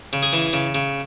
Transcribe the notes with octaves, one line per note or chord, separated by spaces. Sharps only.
C#3
G#4
E3
C#3
C#3